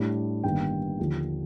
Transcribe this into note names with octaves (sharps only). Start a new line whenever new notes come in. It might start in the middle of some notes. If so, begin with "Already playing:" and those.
Already playing: A2 G3 D4
G1 G2 D#3 A#3 G5
D#2 D3 F3